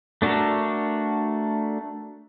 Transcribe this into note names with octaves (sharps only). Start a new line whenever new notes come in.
A3 D4 F#4 A4 A#4